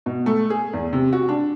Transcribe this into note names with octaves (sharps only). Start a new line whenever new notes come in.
B2
A3
G#4
E2
C3
F#4
D4